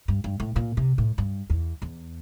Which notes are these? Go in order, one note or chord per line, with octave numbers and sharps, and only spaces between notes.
G2
G2
A2
A#2
C3
A2
G2
E2
E2